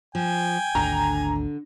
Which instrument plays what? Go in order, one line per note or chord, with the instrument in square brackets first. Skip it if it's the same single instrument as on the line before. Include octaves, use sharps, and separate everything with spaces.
[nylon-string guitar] F3 [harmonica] G5 G#5
[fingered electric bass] G#1 D2 [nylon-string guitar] D3 D4 [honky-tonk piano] A#5